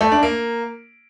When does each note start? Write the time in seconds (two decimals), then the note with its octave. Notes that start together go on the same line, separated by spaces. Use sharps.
0.01 A3
0.12 D4
0.23 A#3